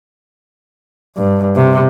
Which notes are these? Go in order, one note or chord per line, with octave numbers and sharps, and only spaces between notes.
G2
C3